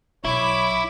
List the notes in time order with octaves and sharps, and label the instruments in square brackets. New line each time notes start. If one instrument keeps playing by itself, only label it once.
[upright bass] B1 [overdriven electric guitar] E4 [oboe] C#5 [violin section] B5 D6